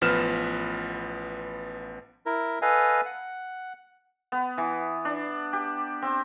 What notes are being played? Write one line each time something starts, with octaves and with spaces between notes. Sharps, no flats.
A1 F3 B3 B4 F6 E7
E4 A#4
A4 B4 D#5 F5 G#5
F#5
B3
E3
D4
G4
C4